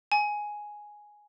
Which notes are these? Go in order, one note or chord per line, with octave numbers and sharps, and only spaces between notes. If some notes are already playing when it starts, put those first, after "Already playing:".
G#5